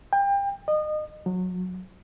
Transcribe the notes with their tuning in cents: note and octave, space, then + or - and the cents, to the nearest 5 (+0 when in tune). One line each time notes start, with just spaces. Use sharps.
G5 +30
D#5 -30
F#3 -25